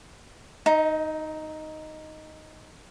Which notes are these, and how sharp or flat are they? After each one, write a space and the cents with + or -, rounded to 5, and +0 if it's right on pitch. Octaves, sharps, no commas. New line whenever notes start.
D#4 +0 D#5 +40